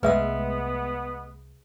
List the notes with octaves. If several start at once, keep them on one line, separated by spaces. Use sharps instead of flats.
C2 G#3 A3 B3 B4 E5 E6